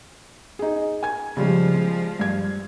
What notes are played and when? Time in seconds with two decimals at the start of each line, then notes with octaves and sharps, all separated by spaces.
0.59 D#4 G#4
1.03 G#5 G#6
1.37 C#3 F3 G3 G#3
1.74 G#3
2.19 G2 G#6